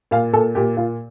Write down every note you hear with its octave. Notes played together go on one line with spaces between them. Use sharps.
A#2 F5
A#2 A4
A#2 G4
A#2 F4